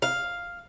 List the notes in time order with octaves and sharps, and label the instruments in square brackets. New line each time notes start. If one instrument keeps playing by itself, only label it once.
[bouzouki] F5